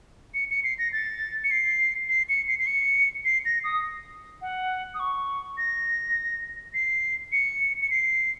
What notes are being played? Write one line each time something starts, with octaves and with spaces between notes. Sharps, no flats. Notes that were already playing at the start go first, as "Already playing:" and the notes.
C#7
C#7
C7
A#6
A6
C#7
C7
C7
C#7
C7
C7
C#7
C7
A#6
D#6
F#5
D#6
C#6
A#6
C7
C#7
C#7
C7